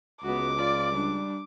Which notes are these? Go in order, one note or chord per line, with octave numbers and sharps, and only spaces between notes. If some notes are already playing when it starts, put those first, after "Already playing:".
C#2 G#3 B3 F#4 D6
F4 D5
G3 D4